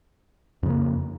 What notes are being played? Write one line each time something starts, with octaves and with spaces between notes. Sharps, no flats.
F2 C#3 A#3